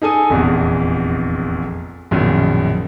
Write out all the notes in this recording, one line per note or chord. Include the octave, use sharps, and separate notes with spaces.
D#4 G#4 A4 G#5 D#6
F1 A#1 E2
A#1 F#2 B2 D#3